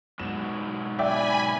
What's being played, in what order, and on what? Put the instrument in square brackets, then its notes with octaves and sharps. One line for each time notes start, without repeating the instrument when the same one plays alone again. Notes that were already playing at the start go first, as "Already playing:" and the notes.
[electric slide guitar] G#2 B2 F#3 [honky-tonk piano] E7
[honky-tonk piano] D5 E5 G5 [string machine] G#5 B5